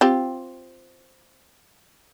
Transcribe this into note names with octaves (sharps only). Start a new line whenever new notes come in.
C4 F4 G4